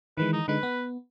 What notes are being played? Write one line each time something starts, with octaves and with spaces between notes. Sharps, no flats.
D#3 E3 G#3 B4
D#4
D3 G#3 D#4 B4
B3